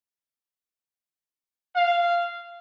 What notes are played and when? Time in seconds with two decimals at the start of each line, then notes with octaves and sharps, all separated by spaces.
1.75 F5